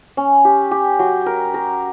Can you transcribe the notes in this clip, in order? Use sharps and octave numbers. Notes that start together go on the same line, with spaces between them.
C#4
G4
G4
F#3
A#4
A#4